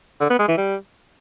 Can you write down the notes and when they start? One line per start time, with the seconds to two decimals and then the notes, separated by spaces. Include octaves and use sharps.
0.21 D3
0.30 B3
0.39 G#3
0.48 E3
0.58 G3